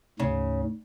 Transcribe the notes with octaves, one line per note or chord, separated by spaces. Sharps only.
D2 G#2 C#3